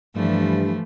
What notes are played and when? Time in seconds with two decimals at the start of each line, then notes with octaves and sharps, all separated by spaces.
0.15 G2 E3 F3 A3